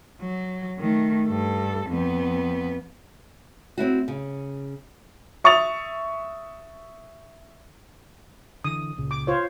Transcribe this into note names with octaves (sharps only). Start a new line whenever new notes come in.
F#3
D#3 A3
G2 A4
F2 B3
C4 C#4 E4 F#4
C#3
E5 C#6 D#6 A6 F7
D3 E3 D#6
C#2 A#2 C#3
D6
F4 C5 C#5